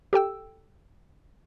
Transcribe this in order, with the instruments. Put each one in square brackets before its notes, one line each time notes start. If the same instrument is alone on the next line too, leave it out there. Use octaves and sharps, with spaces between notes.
[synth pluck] G4 A4 G5 E6